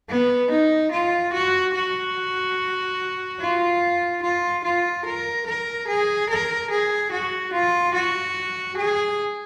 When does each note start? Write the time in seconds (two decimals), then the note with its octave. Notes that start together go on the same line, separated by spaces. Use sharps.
0.09 B3
0.50 D#4
0.91 F4
1.33 F#4
1.75 F#4
3.40 F4
4.22 F4
4.64 F4
5.05 A#4
5.46 A#4
5.88 G#4
6.29 A#4
6.70 G#4
7.11 F#4
7.53 F4
7.94 F#4
8.77 G#4